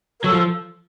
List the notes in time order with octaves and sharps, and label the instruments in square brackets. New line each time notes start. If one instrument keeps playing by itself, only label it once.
[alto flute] A#4
[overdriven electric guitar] F#3 [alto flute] A4
[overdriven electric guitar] F3